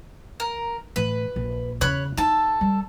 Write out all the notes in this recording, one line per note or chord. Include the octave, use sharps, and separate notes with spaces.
A#4
A2 E3 B4
A#1
E2 C#3 C#5 B5 F#6
D#4 A4 A5
G3